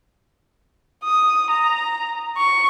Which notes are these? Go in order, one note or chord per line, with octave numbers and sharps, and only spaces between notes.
D#6
A#5
C#6